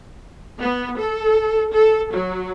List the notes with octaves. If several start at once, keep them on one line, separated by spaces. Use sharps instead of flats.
B3
A4
A4
F#3